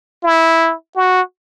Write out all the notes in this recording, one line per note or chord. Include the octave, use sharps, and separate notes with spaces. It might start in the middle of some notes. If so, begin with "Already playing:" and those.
E4
F#4